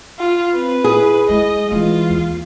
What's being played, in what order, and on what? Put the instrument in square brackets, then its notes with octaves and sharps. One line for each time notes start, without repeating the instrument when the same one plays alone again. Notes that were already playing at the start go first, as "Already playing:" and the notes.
[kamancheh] F4
[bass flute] C4 [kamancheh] B4
[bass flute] E4 [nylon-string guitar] G#4
[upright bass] G#3 [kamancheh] D#5
[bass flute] E3 [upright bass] G#3 C#4 [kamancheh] F4
[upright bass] D#2